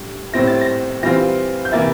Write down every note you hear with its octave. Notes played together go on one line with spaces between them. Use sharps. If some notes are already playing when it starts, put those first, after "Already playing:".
Already playing: A2 G3 D4
A2 G3 C4 E4 A#6
A6
A#6
E3 G3 C4 F4 A#6
G6
C3 E3 A#3 E4 A6